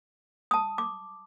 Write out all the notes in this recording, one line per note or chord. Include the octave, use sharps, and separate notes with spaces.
A5 D#6
D6